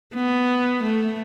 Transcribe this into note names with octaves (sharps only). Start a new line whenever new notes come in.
B3
A3